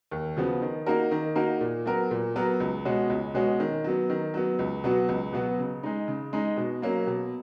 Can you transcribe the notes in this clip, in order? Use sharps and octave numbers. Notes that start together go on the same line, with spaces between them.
D#2
C#3 F3 B3 F#4
D#3
A#3 D#4 F#4 A#4
D#3
A#3 D#4 F#4 A#4
A#2
F#3 B3 F#4 A#4
A#2
F#3 B3 F#4 A#4
C#2
B2 G#3 C#4 F#4
C#2
B2 G#3 C#4 F#4
D#3
F#3 B3
D#3
F#3 B3
C#2
B2 F#3 B3 F#4
C#2
B2 F#3 B3 F#4
C#3
G#3 D#4
C#3
G#3 D#4
B2
F#3 A#3 C#4
B2